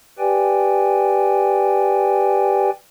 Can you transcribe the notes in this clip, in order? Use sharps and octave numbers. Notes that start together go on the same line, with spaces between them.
G4 B4 D5 G5 G#5